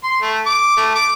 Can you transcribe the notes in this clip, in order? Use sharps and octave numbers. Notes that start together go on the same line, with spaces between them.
C6
A3
D6
A3
D6